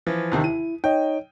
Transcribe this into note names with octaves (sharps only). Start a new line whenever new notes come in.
E3 F3
D#2 C3 D#3
E4 D#7
D#4 C#5 D#5 G5